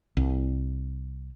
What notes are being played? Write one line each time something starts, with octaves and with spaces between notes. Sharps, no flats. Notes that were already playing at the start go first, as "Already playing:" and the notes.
C2